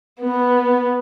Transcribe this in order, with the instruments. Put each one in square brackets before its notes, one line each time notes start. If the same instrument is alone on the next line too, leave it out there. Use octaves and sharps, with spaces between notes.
[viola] B3